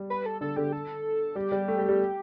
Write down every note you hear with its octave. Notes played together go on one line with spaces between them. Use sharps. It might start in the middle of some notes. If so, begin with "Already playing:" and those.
Already playing: G3
B4
A4
D3 A4
D3 G4
A4
G3 G4
G3
A3
G3
G3